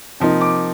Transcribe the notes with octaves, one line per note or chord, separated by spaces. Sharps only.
C3 F3 A#3 D#4
D6